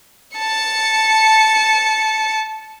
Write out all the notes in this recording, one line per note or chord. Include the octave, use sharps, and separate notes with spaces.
A5 C#7